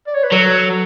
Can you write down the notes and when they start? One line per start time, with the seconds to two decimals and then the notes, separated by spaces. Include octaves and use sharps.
0.07 D5
0.15 C#5
0.24 B4
0.32 F#3 A4